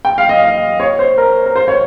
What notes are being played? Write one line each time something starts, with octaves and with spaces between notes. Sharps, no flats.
G5
F5
D#5
F5
C#5
C5
A#4
A#4
C5
C#5